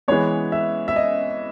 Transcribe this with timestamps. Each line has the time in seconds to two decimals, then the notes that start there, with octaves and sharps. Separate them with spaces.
0.08 E3 G#3 B3 C#5
0.52 E5
0.88 E5
0.96 D#5